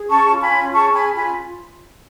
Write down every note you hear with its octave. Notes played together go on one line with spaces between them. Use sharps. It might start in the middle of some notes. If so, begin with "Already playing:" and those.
Already playing: G#4
C#4 A5 C#6
F4
G#5 B5
C#4
G#4 A5 C#6
C#4 G#5 B5
F4 G#5 B5